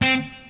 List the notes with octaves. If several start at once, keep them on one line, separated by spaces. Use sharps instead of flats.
C4